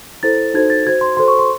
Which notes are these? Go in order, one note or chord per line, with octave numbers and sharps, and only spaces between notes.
E4 A4 C5 A6
D#4 F#4 A4 C5 G#6
A6
F#4 C5 G#6
C6
F#4 A4 C5 C6
C#6
C6